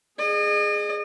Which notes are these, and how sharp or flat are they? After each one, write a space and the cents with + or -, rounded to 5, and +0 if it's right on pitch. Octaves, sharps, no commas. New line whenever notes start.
G#4 +0 D#5 -40